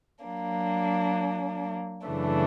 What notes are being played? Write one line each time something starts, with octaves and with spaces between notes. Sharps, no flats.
F#3 A#3 D4
F#2 C#3 E3 A3 D4